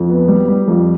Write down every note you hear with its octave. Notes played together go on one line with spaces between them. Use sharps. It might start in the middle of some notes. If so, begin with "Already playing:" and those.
Already playing: F2
B3
G3
G3
F2